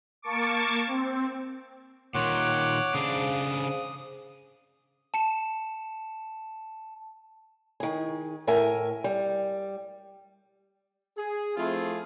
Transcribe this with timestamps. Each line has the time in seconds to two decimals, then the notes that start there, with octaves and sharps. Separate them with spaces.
0.22 A#3 A5 C#6 D6
0.87 C4
2.15 A#2 D#3 C#5 F#5 C6 D6
2.94 C#3 D4 G#4 C5 F5 D#6
5.14 A5 C#7 E7
7.80 D#3 G#4
8.47 A2 A#4 E5 G#5
9.04 G3
11.18 G#4
11.56 F3 A3 C4 E4 F4 G#4